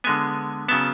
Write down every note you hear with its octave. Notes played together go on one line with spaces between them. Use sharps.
D3 G#3 B3 G#5
C#3 F#3 B3 A5